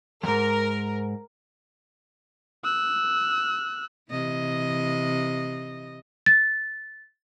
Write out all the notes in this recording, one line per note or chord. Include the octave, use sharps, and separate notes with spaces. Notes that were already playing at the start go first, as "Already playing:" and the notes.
F2 G#2 A#4
E6 F#6
C3 E3 D#5
A6